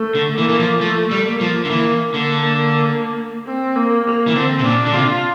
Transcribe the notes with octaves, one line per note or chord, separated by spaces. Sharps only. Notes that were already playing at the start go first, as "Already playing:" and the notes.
Already playing: A3
D3
E3 A#3
E3
F3
F3 A3
G3
A#3
F3
D3
E3 A#3
D3 A#3
C4
A#3
A#3
E3
D3 C4
C3
A#2 D4
D3
C3 F4